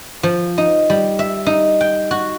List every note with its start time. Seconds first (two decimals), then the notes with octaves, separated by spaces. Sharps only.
0.23 F3
0.58 D#4
0.90 G3
1.19 E5
1.46 D#4
1.81 G5
2.11 F#4